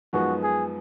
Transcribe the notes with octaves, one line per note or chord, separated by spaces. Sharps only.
F#2 F3 G#3 B3 D#4 F#4
G#4